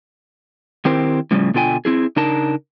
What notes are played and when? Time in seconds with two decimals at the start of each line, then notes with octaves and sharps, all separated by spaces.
0.85 D#3 C4 E4 G4 A#4 C5
1.31 A2 C#3 F3 G3
1.54 B2 D3 F4 G5 G#5
1.85 C4 E4 G#4
2.16 C#3 D4 D#4 A#4 A5